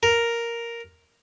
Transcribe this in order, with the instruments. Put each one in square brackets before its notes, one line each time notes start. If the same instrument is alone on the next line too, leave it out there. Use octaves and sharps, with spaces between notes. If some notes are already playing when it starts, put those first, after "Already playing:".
[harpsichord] A#4